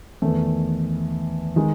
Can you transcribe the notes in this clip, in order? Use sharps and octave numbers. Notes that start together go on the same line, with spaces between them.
E2 D#3 A3
D#3 G#3 D#4